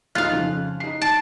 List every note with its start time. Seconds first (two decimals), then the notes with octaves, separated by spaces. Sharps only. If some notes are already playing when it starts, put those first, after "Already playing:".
0.15 D2 D#4 F4 F5 F#6
0.32 F2 C#3
0.80 D#4 C7
1.02 A5 D7